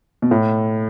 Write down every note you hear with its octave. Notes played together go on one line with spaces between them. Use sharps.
B2
A2